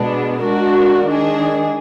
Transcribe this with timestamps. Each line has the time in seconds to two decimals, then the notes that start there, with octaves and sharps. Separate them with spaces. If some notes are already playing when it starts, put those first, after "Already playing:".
Already playing: B2 G#3 B3 D4
0.40 G#3 D4 F#4 A#4
1.05 D#3 G#3 D4 G#4